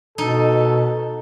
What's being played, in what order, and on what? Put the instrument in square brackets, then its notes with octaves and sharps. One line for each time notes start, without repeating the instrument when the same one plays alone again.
[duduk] B2 [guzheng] D#4 [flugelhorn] A4